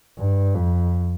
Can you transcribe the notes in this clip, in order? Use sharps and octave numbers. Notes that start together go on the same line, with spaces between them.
G2
F2